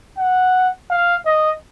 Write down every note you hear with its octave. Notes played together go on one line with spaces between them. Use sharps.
F#5
F5
D#5